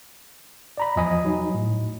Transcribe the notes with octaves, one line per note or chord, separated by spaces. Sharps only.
D5 A#5 B5
E2 F3 D#5 G#5 B5 D#6
F#3 D#4
A2